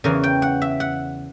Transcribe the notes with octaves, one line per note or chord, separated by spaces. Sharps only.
E2 C#3 E3 A#4
G5
F#5
E5
F#5